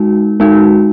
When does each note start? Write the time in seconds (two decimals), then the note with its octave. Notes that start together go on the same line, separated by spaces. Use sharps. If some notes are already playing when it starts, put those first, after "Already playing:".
Already playing: G#3 D#4 F#4
0.40 G#3 D#4 F#4